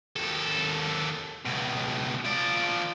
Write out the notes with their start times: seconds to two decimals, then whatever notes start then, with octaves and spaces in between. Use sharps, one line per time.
0.16 D#2 A4
1.45 C#2 B2
2.25 F3 D5